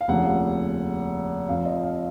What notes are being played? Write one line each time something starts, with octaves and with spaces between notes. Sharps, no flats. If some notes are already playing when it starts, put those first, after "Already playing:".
F5
F1 D#2 C#3 F3 F#5
F2 F3 F5
D#5
F5